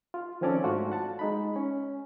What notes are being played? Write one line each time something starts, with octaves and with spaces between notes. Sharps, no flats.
F4
D#3 F3 C4 C#4 A4 D5
G#2 A3 D4 F4 F#4
F#5 A5
G#3 D#4 B5
C#4